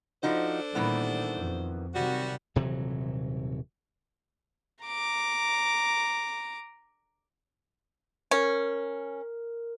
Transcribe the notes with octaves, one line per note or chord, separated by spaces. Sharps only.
F3 D4 D#4 F#4 A4 C5
A#2 D#3 E3 G3 B3
F2
C3 D#3 F#3 G3 F#4
D#1 C3 E3 F#3
A#5 D6
C#4 A#4